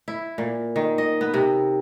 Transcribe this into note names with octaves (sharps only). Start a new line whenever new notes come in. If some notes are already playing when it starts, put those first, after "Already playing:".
E4
A#2
D#3
D#5
B3
C3